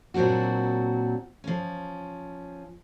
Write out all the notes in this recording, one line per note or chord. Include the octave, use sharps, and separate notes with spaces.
A#2 F#3 C4 D4 F#4
F3 C#4